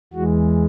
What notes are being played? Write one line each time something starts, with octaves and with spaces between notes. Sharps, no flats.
E2 E3 G#3 F#4